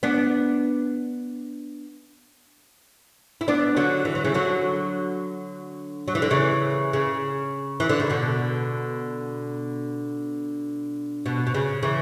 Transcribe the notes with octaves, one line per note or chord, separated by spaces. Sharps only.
B3 D4
E4
B3 D4
D3 F#3
E3
F#3
C#3 E3
D3 F#3
F#3
E3
D3
C#3 E3
C#3
E3
D3
C#3
B2 D3
B2
B2
C#3
C#3 E3